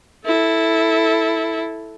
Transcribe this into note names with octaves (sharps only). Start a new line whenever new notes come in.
E4 A4